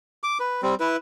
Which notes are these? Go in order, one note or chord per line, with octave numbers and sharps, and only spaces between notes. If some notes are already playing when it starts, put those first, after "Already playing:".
D6
B4
G3 C4
E4 B4